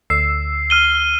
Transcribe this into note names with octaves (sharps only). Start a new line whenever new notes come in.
D2 E6 C7
F6 D#7 G7